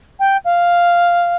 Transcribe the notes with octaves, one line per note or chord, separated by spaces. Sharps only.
G5
F5